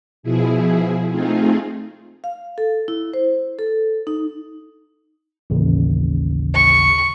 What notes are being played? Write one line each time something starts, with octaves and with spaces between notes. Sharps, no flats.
B2 F3 E4 G#4
A3 C4 D#4 F4 G#4
F5
A4
E4
C5
A4
D#4
A1 D#2 C#3
C#6